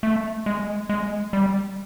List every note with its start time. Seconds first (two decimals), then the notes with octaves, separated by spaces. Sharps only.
0.03 A3
0.46 G#3
0.89 G#3
1.33 G3